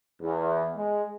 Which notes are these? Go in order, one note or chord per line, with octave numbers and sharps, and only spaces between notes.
E2
G#3